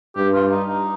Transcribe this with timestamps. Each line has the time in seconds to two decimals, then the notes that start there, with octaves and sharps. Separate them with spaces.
0.16 G2 G4
0.34 F4
0.51 D#4
0.68 D#4